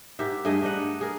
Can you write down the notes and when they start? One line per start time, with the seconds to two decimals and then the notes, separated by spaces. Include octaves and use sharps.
0.19 G#2 G4 A#4 E5
0.45 G2 A3 G#4 D#5
0.62 D4 D#4 D#5 F#5
1.01 G#4 A#4